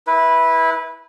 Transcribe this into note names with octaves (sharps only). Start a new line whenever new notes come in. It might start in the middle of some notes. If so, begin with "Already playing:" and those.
E4 B4